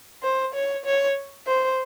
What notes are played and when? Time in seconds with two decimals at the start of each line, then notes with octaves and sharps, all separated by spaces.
0.23 C5
0.54 C#5
0.85 C#5
1.48 C5